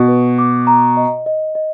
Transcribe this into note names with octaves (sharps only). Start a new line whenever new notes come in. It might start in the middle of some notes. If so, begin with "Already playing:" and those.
Already playing: B2
B4
D6
A#5
D#5
D#5
D#5